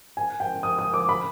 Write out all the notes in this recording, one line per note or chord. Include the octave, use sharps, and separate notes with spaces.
G#5
G5
D#6
D#6
D6
B5